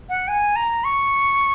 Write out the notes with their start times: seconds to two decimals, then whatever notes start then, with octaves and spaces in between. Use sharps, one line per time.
0.09 F#5
0.28 G#5
0.56 A#5
0.84 C#6